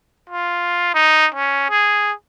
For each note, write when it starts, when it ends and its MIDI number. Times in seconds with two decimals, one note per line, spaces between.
0.30 0.93 65
0.94 1.27 63
1.35 1.69 61
1.70 2.13 68